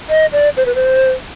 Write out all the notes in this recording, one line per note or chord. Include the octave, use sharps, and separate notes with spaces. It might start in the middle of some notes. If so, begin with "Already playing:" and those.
D#5
D5
C5
B4
C5